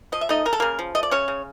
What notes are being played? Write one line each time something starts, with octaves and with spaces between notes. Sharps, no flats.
F3 D#5
E5
A3 D#4 D#5
C#3 A#4
A4
C#3 A#3 A#4
F3
A3 D#5
D5
C#3 C#4 C#5
C#3